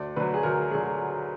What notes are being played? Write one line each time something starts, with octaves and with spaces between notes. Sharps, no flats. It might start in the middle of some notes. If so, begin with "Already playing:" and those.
Already playing: D2 D5
D3 F#3 B4
G#4
D2 A#4
D3 F#3 G#4